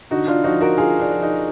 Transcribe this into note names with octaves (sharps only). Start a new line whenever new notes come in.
D3 D#4 F#4
D4 F4
F3 D#4 F#4
F#4 A#4
D3 F4 G#4
D4
F3
D#4